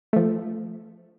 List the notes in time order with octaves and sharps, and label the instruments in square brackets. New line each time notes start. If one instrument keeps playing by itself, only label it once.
[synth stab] F3 A3